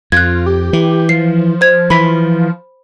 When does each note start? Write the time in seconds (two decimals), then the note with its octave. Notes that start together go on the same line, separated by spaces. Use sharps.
0.12 F2 F4 F#6 G#6
0.46 G4
0.73 E3
1.09 F3 C7
1.61 C5 G#6
1.90 E3 B5 B6